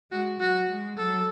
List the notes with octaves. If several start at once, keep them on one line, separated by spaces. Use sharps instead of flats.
G#3 F#4
F#3 F#4
G#3
F#3 A4